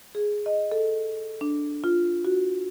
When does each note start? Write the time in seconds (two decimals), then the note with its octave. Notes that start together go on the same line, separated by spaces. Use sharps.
0.15 G#4
0.46 D#5
0.72 A4
1.41 D4
1.84 F4
2.25 F#4